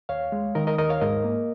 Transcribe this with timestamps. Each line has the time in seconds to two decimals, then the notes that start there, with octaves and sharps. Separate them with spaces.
0.09 D#2 C#5 F5
0.32 G#3
0.55 D#3 A#4 D#5
0.67 A#4 D#5
0.78 D#2 A#4 D#5
0.89 C#5 F5
1.01 G#2 A#4 D#5
1.24 A#3